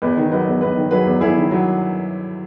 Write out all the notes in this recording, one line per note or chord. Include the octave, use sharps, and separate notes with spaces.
E2 B4 D#5
D#3
F#3 B4 D#5
E2
E2 B4 D#5
D#3
F#3 G#4 B4
E2
E2 E4 G#4
D#3
F#3